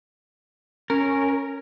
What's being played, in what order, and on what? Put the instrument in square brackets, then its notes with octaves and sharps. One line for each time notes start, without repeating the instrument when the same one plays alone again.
[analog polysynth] C#4 [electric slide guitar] A#4